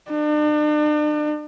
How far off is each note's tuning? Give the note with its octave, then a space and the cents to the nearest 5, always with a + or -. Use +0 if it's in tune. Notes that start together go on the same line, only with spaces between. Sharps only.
D4 +40